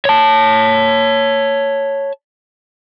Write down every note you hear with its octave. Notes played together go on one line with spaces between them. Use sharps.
C#5 A5